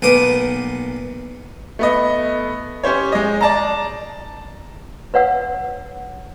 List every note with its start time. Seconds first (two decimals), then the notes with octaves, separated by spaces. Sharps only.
0.02 B1 A#2 B3 D6 D#6
1.79 A3 B3 D#5
2.83 C#4 G4 C5 C#5
3.12 G#3 D#5
3.41 D5 A5 A#5
5.14 B4 C#5 F#5 E6